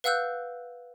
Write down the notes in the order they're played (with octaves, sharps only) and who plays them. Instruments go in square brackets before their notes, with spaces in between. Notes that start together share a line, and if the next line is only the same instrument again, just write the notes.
[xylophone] B4 F5 F#5 E6 F#6 G6